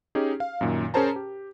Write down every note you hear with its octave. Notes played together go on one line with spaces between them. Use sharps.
C#4 D#4 G4 G#4
F5
F#2 A#2 D#3
C#4 G#4 A#4 C5 A5 A#5
G4